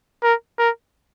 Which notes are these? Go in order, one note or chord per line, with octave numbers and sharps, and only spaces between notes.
A#4
A#4